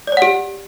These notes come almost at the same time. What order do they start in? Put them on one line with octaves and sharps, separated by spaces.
D5 C#5 F#5 G4